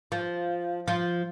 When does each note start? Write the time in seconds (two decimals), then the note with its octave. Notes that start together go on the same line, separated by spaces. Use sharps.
0.12 F3
0.88 F3